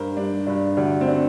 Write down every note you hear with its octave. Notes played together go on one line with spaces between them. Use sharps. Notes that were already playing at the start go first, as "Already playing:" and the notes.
Already playing: G2 G3 A#4 C5
G3 D4
G2 D4
D2 D4
C4
D4